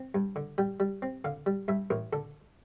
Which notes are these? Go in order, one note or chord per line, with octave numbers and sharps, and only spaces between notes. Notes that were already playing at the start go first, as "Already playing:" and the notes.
Already playing: C4
G2
D3
G3 G5
G3
C4
D3 F5
G3
G2 E5
A1 A#4
D3 A4